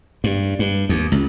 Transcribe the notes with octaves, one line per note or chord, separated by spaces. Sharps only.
G2
G2
D#2
C#2